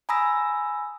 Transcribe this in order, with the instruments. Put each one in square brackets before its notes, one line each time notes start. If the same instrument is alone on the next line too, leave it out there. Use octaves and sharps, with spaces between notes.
[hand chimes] G#5 A#5 B5 D#6 E6 A#6